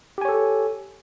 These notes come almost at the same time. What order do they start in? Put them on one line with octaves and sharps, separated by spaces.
G4 G#5 C#5 A4